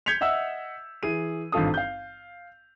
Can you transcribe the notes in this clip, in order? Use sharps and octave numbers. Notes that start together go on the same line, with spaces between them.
G6 G#6 B6 C#7 F7
D#5 E5 F#5 E6
E3 G#4 D#7
G#1 G2 F4 A4 D#6
F5 G6